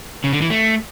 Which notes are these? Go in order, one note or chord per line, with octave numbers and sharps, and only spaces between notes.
C#3
D3
E3
A3